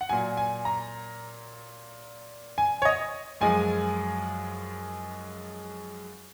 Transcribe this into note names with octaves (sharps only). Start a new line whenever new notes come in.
F#5
A#2 F#3 G#5
G#5
A#5
G#5
C#5
D#5
F#2 F3 G#3 G#5